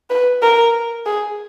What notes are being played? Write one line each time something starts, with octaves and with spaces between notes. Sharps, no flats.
B4
A#4
G#4